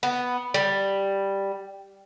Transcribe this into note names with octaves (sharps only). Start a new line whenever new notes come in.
B3
G3